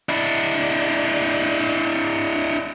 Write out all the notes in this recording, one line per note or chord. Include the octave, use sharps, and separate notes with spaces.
D4 E4